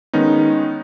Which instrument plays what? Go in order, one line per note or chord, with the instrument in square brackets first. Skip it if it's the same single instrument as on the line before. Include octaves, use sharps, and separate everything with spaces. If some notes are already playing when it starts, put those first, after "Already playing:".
[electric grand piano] D#3 G#3 B3 C#4 D#4